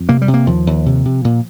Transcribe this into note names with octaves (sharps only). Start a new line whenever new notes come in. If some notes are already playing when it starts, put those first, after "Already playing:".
Already playing: F2
C3 A#3
G3
C3
A#3
D#2 F3
D#2
C3
C3
A#2